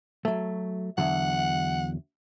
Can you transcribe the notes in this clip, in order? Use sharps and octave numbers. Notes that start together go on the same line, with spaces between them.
F#3 A3
E2 D3 F#3 F#5